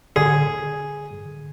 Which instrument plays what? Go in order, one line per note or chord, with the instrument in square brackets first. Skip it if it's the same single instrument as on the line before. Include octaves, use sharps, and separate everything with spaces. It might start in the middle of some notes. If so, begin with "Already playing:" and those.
[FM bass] D3 [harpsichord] G#4